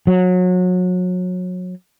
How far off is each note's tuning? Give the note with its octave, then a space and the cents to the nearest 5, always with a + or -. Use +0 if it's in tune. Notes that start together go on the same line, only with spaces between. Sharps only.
F#3 -30